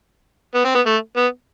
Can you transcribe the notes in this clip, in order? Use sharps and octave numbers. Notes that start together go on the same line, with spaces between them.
B3
C4
B3
A3
B3